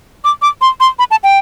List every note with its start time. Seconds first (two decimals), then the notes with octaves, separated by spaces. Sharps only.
0.24 D6
0.42 D6
0.61 C6
0.80 C6
0.99 B5
1.11 A5
1.24 G5